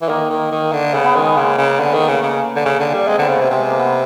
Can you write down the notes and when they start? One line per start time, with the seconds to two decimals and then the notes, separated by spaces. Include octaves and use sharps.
0.02 E3
0.08 D#3 A#3
0.30 D#3
0.51 D#3
0.73 D3
0.94 C#3 B3
1.04 B3
1.15 D#3 G#3
1.26 B3
1.37 C#3 A#3
1.58 C#3
1.79 D3 B3
1.94 D#3
2.01 A#3
2.08 C#3 A3
2.22 C#3 A#3
2.55 D3
2.65 C#3
2.79 D3
2.93 G3
3.08 G#3 C4
3.18 D3 B3
3.29 C#3
3.36 C3 A3
3.50 C3 G#3
3.70 A#3
3.79 B3